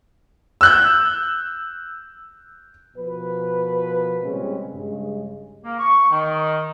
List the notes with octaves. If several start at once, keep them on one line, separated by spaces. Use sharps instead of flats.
E6 F#6 G6
B2 F3 A#4 B4
A#2 C#3 G3 G#3 C4 C#4
G2 C#3 G#3
A#3
C#6
D#3